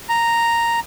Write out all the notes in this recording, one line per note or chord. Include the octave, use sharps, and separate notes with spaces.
A#5